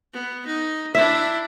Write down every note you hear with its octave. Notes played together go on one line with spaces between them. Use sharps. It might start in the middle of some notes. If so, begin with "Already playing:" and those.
B3
D#4
D4 E4 E5